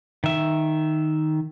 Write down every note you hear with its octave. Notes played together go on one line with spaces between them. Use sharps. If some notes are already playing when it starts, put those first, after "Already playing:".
D#3 E5